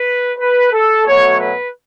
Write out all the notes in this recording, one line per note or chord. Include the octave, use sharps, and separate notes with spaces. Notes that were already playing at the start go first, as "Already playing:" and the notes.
Already playing: B4
B4
A4
B2 F#3 A3 C#5
B4